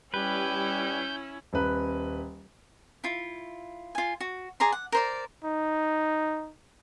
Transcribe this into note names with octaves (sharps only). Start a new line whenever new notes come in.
G3 C#4 E4 B4 G6
D#1 B4
E4 F4
F4 G#5
F#4
G#4 D5 A#5 C6
F#5
A#4 C5 D5
D#4